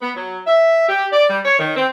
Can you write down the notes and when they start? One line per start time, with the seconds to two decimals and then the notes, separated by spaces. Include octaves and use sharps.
0.02 B3
0.16 F#3
0.47 E5
0.89 G4
1.13 D5
1.30 G3
1.45 C#5
1.60 D#3
1.76 C4